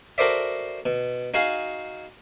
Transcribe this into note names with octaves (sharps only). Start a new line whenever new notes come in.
F#4 A4 A#4 C5 D5 E5
B2
D#4 F#4 G#4 F5